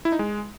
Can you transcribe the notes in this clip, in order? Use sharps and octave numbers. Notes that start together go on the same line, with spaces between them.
E4
D#4
G#3